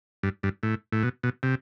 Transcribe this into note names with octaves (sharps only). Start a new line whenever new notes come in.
G2
G2
A2
A2
B2
B2
C3